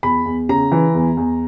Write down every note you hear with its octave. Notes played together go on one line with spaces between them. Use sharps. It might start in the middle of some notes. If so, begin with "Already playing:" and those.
E2 B5
E2
C#3 A#5
E3
E2
E2